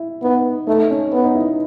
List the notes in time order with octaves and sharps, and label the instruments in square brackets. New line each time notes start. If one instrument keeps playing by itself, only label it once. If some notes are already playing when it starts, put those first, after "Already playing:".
Already playing: [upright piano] E4
[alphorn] B3 [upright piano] D#4
[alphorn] A3 [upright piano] D#4
[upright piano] C#4
[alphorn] B3
[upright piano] D#4
E4